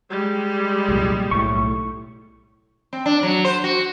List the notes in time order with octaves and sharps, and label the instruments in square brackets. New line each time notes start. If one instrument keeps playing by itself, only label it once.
[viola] G3 G#3
[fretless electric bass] C2 F#2 A#2
[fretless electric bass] B1 A2 [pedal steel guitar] C#6
[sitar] C4
D4
F#3
C5
F#4